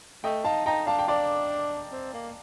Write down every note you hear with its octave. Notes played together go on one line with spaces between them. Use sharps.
A3 D#5 G5
D#4 F5 A5
D#4 G5 A#5
D4 F5 A5
G5
D4 D5 F5
C4
A#3